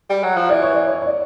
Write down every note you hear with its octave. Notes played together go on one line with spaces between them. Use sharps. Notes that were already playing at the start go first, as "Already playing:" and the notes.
G3
F#3
F3
E3 D5
C#5
D5
C#5
C#5
D5